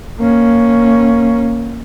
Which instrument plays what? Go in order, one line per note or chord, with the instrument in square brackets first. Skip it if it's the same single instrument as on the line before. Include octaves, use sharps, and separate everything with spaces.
[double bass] A#3 C#4